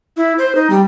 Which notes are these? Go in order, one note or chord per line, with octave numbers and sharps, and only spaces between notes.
E4
C5
D#4
G3